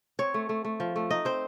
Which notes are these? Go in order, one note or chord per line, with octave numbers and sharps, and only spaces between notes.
C4 C#5
A3
A3
A3
F3
A3
D#4 D#5
C4 C5